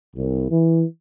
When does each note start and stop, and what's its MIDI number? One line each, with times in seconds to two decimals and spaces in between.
0.16 0.49 36
0.51 0.84 52